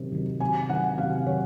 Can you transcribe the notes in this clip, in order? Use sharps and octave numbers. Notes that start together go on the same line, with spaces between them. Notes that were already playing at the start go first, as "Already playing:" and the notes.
Already playing: C3 D#3 F#3
D#3 F#3
C3 G#5
D#3 F#3 F#5
C3 F5
D#3 F#3 C#5